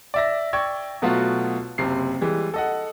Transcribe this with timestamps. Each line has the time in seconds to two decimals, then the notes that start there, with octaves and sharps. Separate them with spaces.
0.14 D5 E5 A#6
0.53 D5 G5 C#6 E6 G#6
1.02 B2 F#3 A3 B3 F4 F#4
1.78 F#1 C3 C7
2.21 E3 G3 G#3
2.54 A4 D#5 F#5